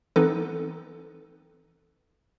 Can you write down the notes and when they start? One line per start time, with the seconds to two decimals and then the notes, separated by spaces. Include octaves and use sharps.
0.16 E3 B3 C4 D#4 A4 B4